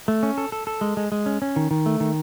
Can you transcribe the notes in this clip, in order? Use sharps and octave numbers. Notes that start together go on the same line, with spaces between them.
A3
C#4
A4
A4
A4
G#3
G#3
G#3
C#4
C#4
D#3
D#3
A3
D#3